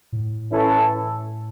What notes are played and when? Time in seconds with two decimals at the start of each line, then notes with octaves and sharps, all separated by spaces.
0.12 A2
0.51 E3 C#4 E4 A4